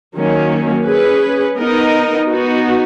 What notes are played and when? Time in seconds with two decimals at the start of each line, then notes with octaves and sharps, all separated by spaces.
0.15 D#3 F#3 A#3 C#4
0.86 C#4 G#4 B4
1.58 B3 D#4 A#4 D#5
2.29 B3 D#4 F#4